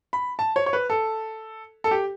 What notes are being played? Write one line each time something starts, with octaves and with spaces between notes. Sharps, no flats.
B5
A5
C#5
C#5
B4
A4
A4
G4